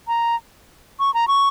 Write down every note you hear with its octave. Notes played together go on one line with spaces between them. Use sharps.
A#5
C#6
A#5
C#6